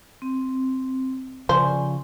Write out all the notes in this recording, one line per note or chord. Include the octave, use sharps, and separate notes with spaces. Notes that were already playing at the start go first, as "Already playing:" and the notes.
C4
C#3 F3 C5 D5 G#5 C#6